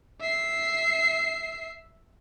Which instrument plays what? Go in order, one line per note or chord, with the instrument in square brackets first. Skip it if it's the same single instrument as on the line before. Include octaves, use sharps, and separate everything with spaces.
[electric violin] E5 C7